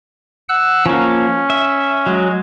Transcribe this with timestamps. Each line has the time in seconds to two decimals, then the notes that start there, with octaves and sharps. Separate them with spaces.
0.49 F#5 E6 F#6
0.86 F3 A#3 C#4
1.50 E5
2.06 F#3 G#3